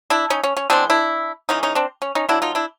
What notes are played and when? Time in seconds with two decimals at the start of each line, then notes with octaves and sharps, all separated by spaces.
0.10 D4 E4
0.30 C#4 D#4
0.43 C#4
0.57 C#4
0.70 E3 G#3 B3 C4 D4
0.90 D4 E4
1.49 C#3 E3 G#3 C#4 D#4
1.63 C#4 D#4
1.75 C4 D4
2.02 C#4
2.15 C#4 D#4
2.29 D3 F#3 A#3 D4 E4
2.42 D#4 F4
2.55 D4 E4